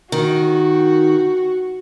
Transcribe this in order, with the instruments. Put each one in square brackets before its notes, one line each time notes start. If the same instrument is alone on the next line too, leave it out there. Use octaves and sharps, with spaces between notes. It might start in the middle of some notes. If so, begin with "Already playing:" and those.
[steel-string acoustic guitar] D#3 [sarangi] F#4